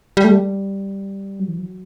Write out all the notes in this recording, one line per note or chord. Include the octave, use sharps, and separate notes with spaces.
G3
A3
G3
F#3
E3
F#3